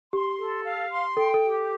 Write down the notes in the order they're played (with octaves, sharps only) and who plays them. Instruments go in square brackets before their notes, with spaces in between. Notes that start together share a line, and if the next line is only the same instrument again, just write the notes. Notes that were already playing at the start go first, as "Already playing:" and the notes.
[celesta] G4 [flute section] C6
[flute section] A4
F5
C6
[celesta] A4 [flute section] G5
[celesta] A4
[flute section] G4